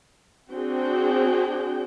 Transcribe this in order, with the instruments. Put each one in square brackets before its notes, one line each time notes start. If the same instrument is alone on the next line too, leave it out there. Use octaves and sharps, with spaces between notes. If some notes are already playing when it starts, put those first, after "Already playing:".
[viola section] C4 D4 F#4 G#4 G5